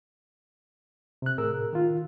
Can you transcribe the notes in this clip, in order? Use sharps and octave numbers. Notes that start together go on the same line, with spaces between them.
C3 F#6
A2 G#4 A#4 E6
D#3 F4